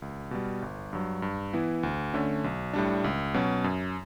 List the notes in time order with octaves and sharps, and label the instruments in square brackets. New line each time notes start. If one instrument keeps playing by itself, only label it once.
[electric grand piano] C#2
B2 G3
G1
G2 F#3
G2
E3 B3 E4
D2
D3 A3 C#4
B1
A2 G3 D4
C#2
B2 F#3 C#4
F#2